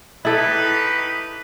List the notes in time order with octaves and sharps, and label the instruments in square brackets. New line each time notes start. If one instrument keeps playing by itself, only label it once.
[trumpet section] D#4 G4 B4 [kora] E4 A4